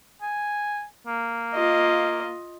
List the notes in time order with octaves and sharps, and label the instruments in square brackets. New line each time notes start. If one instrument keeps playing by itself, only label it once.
[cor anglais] G#5
A#3
[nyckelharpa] F4 D#5